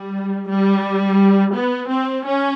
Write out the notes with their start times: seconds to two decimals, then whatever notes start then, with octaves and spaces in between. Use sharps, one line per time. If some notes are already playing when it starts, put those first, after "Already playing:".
Already playing: G3
0.49 G3
1.55 B3
1.90 C4
2.25 C#4